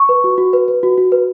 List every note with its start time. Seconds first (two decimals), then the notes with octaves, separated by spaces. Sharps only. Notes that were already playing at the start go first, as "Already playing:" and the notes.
Already playing: C#6
0.09 B4
0.24 F#4
0.38 F#4
0.53 B4
0.68 B4
0.83 F#4
0.98 F#4
1.12 B4